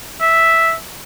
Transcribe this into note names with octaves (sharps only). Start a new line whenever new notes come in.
E5